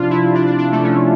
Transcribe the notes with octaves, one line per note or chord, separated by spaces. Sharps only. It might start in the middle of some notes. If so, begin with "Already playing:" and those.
Already playing: C3 F3 D4 F4
E4
D4
D4
D4
A3
C#4